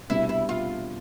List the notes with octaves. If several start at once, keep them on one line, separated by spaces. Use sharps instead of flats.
C2 B2 G3 B3 D4 E4
E4
F4